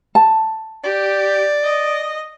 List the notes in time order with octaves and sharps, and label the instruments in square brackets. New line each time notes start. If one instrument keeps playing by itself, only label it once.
[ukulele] A5
[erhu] G4 [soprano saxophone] D5
[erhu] D#5